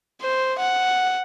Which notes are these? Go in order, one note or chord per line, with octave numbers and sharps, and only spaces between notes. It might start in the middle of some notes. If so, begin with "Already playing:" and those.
C5
F#5